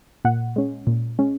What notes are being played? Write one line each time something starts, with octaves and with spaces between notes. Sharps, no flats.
A#2 F#5
G#3 C#4
A#2
G#3 C#4